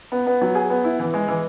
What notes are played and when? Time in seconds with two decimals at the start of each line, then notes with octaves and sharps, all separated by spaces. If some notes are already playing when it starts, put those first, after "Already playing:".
0.12 B3
0.27 B3
0.41 F#3
0.55 G#4
0.70 B3
0.84 E4
0.99 E3
1.14 G#3
1.28 E3